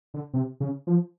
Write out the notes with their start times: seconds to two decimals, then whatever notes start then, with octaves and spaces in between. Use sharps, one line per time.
0.14 D3
0.34 C3
0.60 C#3
0.87 F3